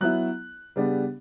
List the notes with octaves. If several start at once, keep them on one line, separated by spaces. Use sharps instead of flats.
F#3 B3 E4 F#6
C#3 G3 B3 D4